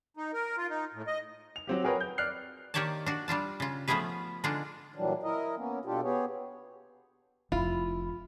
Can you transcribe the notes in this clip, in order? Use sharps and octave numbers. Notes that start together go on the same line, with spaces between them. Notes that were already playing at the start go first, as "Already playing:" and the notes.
D#4
A#4
F4
D#4
A2
D#5
F7
F#3 C4 G4
F#4 G#4 A#4 B4 C#5 G5
G6
D5 F6 F#6 C7
D#3 A#3 G4 C#5 D5 A5
D4 F#4
G3 D4 F4 A5
C#3 F4
F3 A3 B3 C#4 G#4 B4
D3 G#3 D4 D#4 F4
A#2 E3 F#3 G3 D4
E4 A#4 D#5
A#3 B3 C#4
B2 G3 D4 F4 G4 A4
B3 G4 G#4 C#5
F1 E4 F4